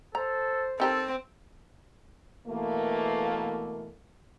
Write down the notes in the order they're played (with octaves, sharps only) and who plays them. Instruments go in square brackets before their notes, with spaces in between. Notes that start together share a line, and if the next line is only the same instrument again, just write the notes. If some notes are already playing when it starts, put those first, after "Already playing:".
[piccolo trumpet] A4 [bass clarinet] C5 [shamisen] A#5
[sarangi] C4 [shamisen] D#4 G4 A#4 [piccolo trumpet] A4
[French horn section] B2 E3 A3 A#3